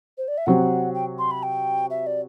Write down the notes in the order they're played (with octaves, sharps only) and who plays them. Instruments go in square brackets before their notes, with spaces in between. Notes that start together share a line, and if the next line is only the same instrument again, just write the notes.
[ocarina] C5
D5
E5
[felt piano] C3 F#3 C4 [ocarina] F#5
[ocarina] G5
C6
B5
G5
E5
D5